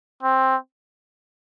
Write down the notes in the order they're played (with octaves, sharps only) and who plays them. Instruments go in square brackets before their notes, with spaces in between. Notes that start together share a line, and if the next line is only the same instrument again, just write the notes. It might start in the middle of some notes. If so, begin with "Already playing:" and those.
[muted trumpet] C4